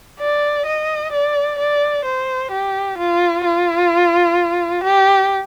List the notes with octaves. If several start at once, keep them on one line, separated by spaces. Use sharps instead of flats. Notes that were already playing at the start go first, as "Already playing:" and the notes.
D5
D#5
D5
D5
C5
G4
F4
F4
G4